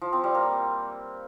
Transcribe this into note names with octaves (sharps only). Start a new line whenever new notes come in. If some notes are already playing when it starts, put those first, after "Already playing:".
F3
C4
G3
A#3